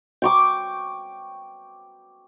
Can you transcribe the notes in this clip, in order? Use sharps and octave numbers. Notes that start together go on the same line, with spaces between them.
G5 C#6 D6